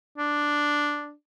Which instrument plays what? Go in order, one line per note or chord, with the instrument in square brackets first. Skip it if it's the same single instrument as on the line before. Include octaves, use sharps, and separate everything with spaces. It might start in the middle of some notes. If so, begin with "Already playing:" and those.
[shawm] D4